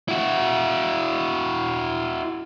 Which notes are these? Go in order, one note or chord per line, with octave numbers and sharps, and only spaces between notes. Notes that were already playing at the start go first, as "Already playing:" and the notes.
E4 F#4